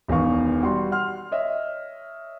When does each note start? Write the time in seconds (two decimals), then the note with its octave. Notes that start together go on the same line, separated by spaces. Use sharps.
0.08 E1 E2 D#3 B4 F5 C#6
0.62 G3 F#4 C6
0.92 F#5 C6 F6
1.32 C#5 D#5 E5